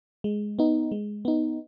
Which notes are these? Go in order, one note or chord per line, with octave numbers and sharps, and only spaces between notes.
G#3
B3 D#4
G#3
B3 D#4